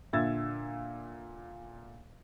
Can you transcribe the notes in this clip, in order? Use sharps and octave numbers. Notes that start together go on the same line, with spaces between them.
A#2 D3 E5 E6 G#6 A6